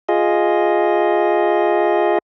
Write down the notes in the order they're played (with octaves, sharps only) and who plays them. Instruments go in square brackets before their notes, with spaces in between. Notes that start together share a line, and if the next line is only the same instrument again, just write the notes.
[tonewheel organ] F4 G#4 D#5